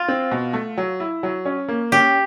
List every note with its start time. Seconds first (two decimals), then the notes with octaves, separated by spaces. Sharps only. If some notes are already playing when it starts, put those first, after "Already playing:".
Already playing: F4
0.08 C4
0.31 B2
0.53 A3
0.77 F#3
1.00 E4
1.23 F#3
1.45 C#4
1.68 A#3
1.92 C#4 G4